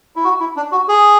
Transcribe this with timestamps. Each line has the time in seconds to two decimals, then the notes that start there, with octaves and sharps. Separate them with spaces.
0.16 E4
0.24 F#4
0.40 E4
0.56 D4
0.72 F#4
0.88 G#4